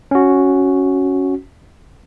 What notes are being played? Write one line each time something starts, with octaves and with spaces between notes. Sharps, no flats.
C#4 F#4